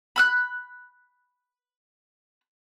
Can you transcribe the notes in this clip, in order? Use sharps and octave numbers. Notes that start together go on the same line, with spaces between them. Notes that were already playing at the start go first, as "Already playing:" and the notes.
B5 F6 F#6